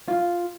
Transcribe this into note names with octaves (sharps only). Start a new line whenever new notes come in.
F4